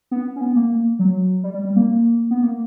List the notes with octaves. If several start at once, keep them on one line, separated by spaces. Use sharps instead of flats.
B3
C#4
B3
A#3
F#3
G3
G3
G3
A#3
B3
A#3